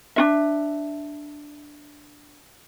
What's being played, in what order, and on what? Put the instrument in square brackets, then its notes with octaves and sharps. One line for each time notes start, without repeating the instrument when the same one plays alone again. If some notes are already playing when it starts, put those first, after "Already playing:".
[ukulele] D4 F4 E5